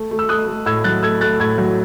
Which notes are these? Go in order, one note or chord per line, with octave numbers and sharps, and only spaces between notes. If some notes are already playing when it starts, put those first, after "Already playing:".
Already playing: A3
A3
E6
A3 D#6 F#6
A3
A2 E6 G#6
F#3 F#6 A6
A3 E6 G#6
A3 F#6 A6
A2 E6 G#6
F#3